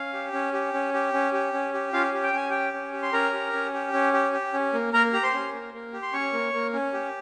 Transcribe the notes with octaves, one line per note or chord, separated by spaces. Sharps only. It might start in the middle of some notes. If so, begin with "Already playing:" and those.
Already playing: C#4 F5
G4
C#4
G4
C#4
G4
C#4
G4
C#4
G4
C#4 F4 F5
G4
G5
C#4 G#5
G4 G5
C#4
G4
C6
C#4 A#4 A#5
G4
C#4
G4
C#4
G4
G4
C#4
A#3
A#3 A#4 A#5
G4 A#5
C5 C6
C#4
A#3
A#3
G4
C6
C#4 C#5 C#6
A#3
A#3
C#4
G4